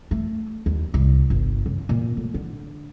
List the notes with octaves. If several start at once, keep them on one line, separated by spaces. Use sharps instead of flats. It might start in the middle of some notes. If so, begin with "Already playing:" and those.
A3
D#2
C2
G1
C#3
A#2
A2
D3